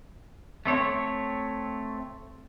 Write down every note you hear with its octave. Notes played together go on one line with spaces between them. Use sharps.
A3 C4 C#5